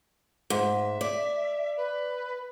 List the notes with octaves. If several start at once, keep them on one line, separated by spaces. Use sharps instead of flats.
G#2 E5
D5
B4